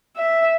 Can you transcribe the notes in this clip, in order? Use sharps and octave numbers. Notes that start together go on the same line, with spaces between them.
E5